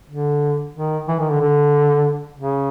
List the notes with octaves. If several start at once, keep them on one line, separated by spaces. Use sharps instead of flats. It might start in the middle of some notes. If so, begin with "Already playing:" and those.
D3
D#3
E3
D#3
D3
D3
C#3